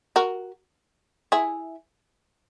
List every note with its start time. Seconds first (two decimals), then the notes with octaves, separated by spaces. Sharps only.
0.16 F#4 A#4
1.32 E4 G#4